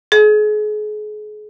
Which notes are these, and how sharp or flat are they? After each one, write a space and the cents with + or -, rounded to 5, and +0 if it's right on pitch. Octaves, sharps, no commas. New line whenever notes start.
G#4 +35